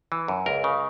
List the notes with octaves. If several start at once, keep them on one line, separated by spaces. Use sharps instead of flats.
E3
F#2
C#2 A#4
C#3